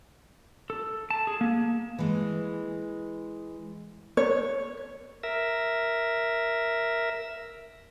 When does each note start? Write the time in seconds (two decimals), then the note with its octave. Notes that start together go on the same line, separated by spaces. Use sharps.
0.70 A4
1.10 A5
1.27 G#4
1.41 A#3
1.99 E3 G#3
4.17 C#5
5.23 A#4 E5